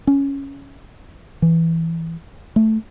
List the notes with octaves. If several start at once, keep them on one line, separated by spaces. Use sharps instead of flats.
C#4
E3
A3